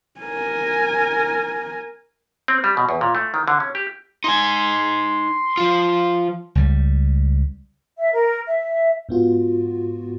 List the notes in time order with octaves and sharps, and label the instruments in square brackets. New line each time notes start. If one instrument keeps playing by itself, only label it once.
[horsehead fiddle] A#4 G#5
[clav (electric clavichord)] C4
G3
B2
E2
A#2
A3
D#3
D3
C#4
G4
[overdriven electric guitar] D#4 G#5 [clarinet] C6
[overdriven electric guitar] F3 F4
[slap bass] C#2 G3
[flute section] E5
A#4
E5
[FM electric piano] G#2 B3 F4 F#4